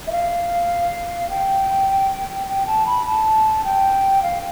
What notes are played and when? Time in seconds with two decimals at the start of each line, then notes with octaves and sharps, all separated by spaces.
0.07 E5
0.12 F5
1.30 G5
2.47 G5
2.67 A5
2.86 B5
3.06 A5
3.64 G5
4.23 F5